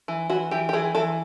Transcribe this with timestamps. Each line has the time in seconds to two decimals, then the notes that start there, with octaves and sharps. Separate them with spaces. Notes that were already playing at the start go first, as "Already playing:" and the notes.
0.08 E3
0.30 E3 F#4
0.51 E3 G4
0.69 G4
0.73 E3 G#4
0.95 E3 A4